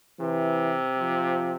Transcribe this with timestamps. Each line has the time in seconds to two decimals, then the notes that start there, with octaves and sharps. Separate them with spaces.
0.20 C3 E3
0.99 F3